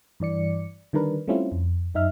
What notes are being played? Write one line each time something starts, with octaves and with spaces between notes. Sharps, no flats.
G2 E3 D5 C#7
D3 D#3 G3 D4 A#4 B4
G3 A3 C4 C#4 E4 F4
F2
F#2 D#4 E5 F6